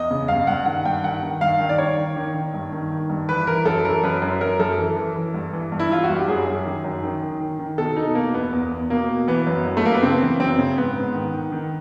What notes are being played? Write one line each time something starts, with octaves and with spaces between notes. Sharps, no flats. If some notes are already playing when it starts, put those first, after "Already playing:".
Already playing: E2 D#5
C#3
G2 F5
G2 F#5
D#3 F#5
G2 G5
D#3 F#5
D#3
G2 F5
D#3
D5
D#3 C#5
D#3
D#3
D#3
G2
D#3
D#3
G2
E3 B4
E3 A#4
F#2 A4
E3 A#4
F#2 B4
F#2
F#2 A#4
F#2 A4
E3
E3
E3
G2
E3
G2
E4
E3 F4
F#4
G2
G4
F#2 G#4
F#2
D#3
F#2
D#3
D#3
D#3
D#3
B2 A4
B2 D#4
B2 A#3
E2 B3
E2
E2
B2 A#3
B2
E3 B3
F#2
F#2
A3
F#2 A#3
B3
C#3 C4
E3
F#2 C4
C#3
G#2 B3
G#2
D#3
D#3
D#3